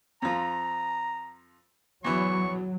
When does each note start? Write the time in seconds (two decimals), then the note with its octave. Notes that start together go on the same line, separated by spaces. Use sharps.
0.22 F2 F3 A#5
2.04 E2 E3 F#3 C#6